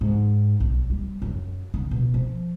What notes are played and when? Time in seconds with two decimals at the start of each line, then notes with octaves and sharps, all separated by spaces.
0.01 G#2
0.60 B1
0.90 G3
1.22 F#2
1.74 D3
1.91 B2
2.14 F3